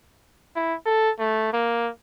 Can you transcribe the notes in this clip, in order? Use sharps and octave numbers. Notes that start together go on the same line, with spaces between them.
E4
A4
A3
A#3